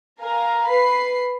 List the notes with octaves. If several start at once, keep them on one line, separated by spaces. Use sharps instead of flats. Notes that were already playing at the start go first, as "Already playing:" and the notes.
A#4 F5 G#5 A#5
B4 B5 C7